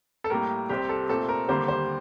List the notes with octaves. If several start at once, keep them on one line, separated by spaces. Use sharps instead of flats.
A4
A2 G3 A#3 A#4
C2 C3 G3 C4 G4
A4
A#2 A3 C4 A4
A#4
D#2 D3 G3 A#3 C5
C5